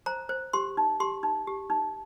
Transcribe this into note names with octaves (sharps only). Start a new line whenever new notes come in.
C5 A#5
C5
G4 C6
D#4
G4 C6
D#4
G4
D#4